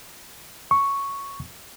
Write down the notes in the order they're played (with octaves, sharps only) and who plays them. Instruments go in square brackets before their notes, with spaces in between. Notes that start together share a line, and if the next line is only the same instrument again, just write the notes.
[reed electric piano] C#6